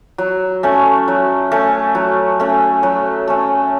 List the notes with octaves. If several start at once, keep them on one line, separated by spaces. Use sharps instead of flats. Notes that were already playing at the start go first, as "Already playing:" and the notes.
F#3
A3 C#4
F#3
A3 C#4
F#3
A3 C#4
F#3
A3 C#4